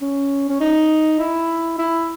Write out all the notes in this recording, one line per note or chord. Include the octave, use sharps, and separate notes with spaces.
C#4
C#4
D#4
E4
E4